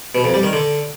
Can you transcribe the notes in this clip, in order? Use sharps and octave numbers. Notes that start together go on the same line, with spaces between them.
B2
F2
G3
D#3
D3